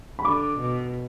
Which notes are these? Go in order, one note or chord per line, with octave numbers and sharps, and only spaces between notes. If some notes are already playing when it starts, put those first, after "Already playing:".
B5
D3 D6
B2